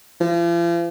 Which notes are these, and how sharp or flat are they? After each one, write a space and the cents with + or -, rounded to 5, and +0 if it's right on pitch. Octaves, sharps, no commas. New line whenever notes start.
F3 -40